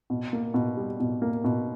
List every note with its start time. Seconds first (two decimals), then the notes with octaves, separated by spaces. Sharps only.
0.10 B2
0.33 A#3
0.54 B2
0.77 G3
1.00 B2
1.22 A#3
1.44 B2